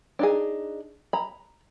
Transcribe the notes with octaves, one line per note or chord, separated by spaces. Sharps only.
D4 D#4 G#4
A#5 B5